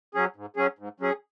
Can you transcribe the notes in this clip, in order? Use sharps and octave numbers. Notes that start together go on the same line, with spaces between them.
F#3 C#4 G#4
G#2
F#3 C#4 G#4
G#2
F#3 C#4 G#4